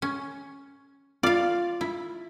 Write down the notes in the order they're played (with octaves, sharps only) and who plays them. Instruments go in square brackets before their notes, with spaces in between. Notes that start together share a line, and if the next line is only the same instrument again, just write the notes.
[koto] C#4
[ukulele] F4 [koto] D5 F5
[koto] E4